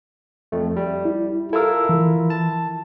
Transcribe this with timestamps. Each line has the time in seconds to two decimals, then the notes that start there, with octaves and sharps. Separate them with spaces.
0.52 F2 A3
0.76 G3
1.05 E4
1.53 E4 F4 A4 A#4 E6
1.89 E3
2.30 A5